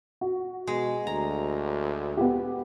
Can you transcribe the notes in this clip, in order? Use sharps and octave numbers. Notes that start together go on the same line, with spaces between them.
F#4
B2 G#3
D2 A#5
B3 G4